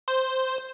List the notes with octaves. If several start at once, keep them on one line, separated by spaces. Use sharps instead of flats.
C5